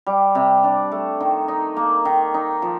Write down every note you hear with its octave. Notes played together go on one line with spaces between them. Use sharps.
G3
C3
D4
A3
D#3
D#4
A#3
D#3
D#4
F3